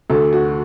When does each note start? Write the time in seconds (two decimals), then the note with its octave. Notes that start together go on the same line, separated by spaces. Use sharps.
0.10 D2 D3 A3 A4
0.33 F#4